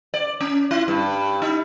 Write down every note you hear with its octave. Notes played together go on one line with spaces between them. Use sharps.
D5
C#4
E4
G2
D#4